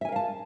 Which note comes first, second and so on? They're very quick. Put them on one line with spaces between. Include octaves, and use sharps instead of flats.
E5 G#5 A#4 F5 A5